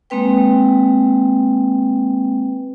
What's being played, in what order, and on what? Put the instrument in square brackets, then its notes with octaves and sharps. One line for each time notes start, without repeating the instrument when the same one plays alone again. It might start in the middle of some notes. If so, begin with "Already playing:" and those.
[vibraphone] G#3 A#3 C4 B4 G5